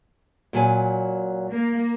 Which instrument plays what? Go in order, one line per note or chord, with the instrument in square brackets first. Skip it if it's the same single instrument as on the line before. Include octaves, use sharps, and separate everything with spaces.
[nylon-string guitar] A#2 F#3 G#5
[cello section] A#3